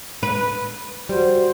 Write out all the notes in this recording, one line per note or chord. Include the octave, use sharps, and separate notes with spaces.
B4
G3 F#4 C5